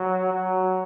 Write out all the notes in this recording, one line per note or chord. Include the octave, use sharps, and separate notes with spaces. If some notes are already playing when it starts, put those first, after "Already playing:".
Already playing: F#3
F#3